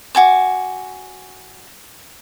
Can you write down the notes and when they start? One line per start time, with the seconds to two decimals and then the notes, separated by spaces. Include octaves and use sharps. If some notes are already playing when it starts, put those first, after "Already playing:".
0.15 F#4 G#5 D6